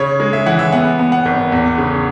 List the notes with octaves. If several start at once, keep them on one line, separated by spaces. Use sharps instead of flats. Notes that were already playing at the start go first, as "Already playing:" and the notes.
Already playing: C#3 C#5
G#3
E5
E3 F#5
E5
B3 F#5
B3
F#5
G#1
E2
C#3